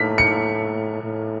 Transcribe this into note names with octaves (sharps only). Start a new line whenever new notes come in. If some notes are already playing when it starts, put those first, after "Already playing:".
Already playing: A2 B6
C#7
A2